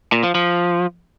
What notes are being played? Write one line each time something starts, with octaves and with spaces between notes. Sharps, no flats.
A#2
F3
F3